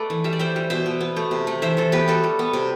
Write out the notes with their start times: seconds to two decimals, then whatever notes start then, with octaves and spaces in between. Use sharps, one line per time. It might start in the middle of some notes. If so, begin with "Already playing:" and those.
Already playing: A3 A4 B4 D5
0.10 E3
0.24 G3 E5
0.33 D5
0.39 G3 C5 E5
0.56 G3
0.70 B2 C5 E5
0.86 B2
1.01 B3
1.16 A3
1.31 C3
1.47 A3
1.62 E3 C5 E5
1.77 E3 A4 C5
1.92 B3 G4 B4
2.08 G3 F#4 A4
2.24 G3
2.39 B3
2.53 C3